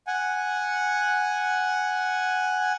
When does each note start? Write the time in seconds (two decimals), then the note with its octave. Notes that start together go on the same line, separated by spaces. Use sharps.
0.07 F#5 G#5